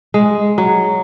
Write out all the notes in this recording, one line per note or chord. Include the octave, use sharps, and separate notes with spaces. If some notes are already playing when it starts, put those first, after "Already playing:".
G#3
F#3